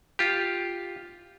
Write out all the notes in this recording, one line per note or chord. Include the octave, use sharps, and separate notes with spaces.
F4 G4